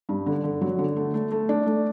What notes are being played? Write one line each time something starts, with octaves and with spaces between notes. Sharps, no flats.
G2
D3
D3
F#3
D3
A3
A3
A3
D4
A3